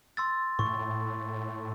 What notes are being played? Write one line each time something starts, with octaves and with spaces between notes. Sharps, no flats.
C6 E6 A6
A2 C#6